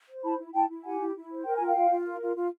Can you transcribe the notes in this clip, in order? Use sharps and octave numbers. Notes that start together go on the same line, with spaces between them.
C5
E4 A5 B5
E4
E4 G5 A5
E4
G4 F#5 G#5
E4
E4
C5
A#4 G5
F4 G#5
F5 G5
F4
F4
A#4
F4
F4